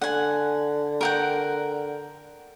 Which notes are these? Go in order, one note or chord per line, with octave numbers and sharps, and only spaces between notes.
D3 F#5 G#5
A#4 F#5 G5